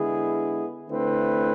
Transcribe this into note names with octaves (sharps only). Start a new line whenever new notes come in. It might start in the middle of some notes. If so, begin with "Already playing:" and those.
Already playing: D3 G#3 B3 E4 G#4
D3 A3 C4 E4 B4